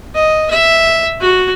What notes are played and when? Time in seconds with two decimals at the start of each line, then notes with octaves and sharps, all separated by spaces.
0.15 D#5
0.51 E5
1.21 F#4